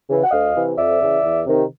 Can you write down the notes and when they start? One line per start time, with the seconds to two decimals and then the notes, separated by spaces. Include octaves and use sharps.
0.08 C#3 E3
0.24 F#5
0.31 D2 D#5 F5
0.55 C3 E3
0.77 F2 D5 E5
1.00 C#3 E3
1.23 E2
1.45 C3 D#3